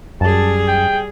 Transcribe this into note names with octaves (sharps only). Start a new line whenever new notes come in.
F#2 G3 G#4 A5
G5